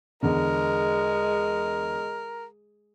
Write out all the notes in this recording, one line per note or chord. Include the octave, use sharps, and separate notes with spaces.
E2 D3 G#3 A#4